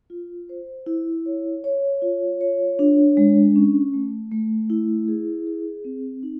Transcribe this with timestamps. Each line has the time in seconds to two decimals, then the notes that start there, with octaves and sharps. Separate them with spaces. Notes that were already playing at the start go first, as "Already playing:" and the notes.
0.10 F4
0.49 C5
0.86 E4
1.26 C#5
1.64 C#5
2.02 F4
2.41 C#5
2.79 D4
3.17 G#3
3.56 C#4
3.94 A3
4.32 A3
4.70 E4
5.08 G#4
5.47 G#4
5.85 C4
6.23 D#4